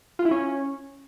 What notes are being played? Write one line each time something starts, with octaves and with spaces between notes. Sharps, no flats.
F4
E4
C#4